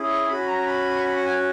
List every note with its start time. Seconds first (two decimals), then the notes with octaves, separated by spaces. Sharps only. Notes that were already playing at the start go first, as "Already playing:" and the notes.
Already playing: C#4 E4 G#4
0.09 C#6
0.28 C#4 F#4 B5
0.48 A#5
0.66 B5
0.96 C#6
1.05 B5
1.16 F#5
1.25 G#5